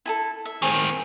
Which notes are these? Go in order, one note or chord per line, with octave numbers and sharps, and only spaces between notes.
E4 G#4 A4
E5
D#3 C4 G#4 C#5